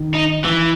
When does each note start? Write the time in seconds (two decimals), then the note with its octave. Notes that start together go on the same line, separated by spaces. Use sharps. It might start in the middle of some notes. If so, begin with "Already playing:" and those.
Already playing: D#3
0.14 D#4
0.44 E3